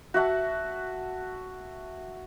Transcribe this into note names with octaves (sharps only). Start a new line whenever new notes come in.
F#4 E5 F#5 A5